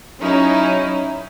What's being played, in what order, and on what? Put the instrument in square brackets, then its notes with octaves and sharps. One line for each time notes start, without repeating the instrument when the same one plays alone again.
[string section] F#3 C#4 D#4 E4